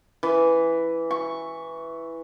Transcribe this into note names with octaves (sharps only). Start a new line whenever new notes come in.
E3
C#6